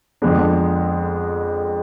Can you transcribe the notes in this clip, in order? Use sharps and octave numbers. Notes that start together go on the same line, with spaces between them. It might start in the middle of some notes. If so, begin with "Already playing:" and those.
F2 D3 G#3 B3 D4